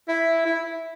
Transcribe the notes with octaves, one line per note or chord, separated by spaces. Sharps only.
E4
E4